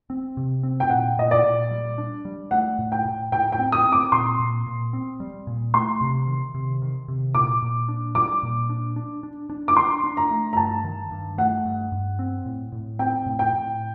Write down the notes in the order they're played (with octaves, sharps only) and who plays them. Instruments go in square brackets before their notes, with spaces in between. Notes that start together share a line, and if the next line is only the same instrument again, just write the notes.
[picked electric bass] C4
C3
C4
[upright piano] G5
[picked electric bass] A#2 [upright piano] F#5
[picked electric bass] A#2 [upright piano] D#5
[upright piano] D5
[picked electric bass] A#2
G3
D4
G3
[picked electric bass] A3 [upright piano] F#5
[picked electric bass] A2
[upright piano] G5
[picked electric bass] A2
[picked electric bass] A2 [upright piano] G5
[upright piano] G5
[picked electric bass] C4
[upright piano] D#6
[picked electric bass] C4
[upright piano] D6
[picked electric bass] A#2 [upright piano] C6
[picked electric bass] A#2
A#2
C4
G3
A#2
[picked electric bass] A3 [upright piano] C6
[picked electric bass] C3
D#3
C3
D#3
C3
[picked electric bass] A#2 [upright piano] D6
[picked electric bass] A#2
D4
[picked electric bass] G3 [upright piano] D6
[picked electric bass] A#2
D4
D4
D4
D4
[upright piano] D6
[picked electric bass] D4 [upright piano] C6
[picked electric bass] D4
[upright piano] A#5
[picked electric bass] A3
[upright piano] A#5
[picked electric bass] G2 [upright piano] A5
[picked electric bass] D#3
G2
[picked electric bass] A3 [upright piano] F#5
[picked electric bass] G2
G2
C4
A2
A2
[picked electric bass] C4 [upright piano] G5
[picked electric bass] A2
[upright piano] G5
[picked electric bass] A2